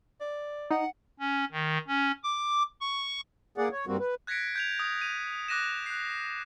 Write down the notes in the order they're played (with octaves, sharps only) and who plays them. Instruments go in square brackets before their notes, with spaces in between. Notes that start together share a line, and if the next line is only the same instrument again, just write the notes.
[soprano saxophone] D5
[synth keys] D#4 [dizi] F#5
[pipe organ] C#4
D#3
C#4
D6
C#6
[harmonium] A#3 G#4 D5 F#5
C#5
G2 G3 A#3 C4 F#4
B4
[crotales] F#6 G#6 A#6 B6 C#7 D7
G6 G#6 F7
D#6
D#7
D6 F#6 A#6 D#7 E7
F#6 C7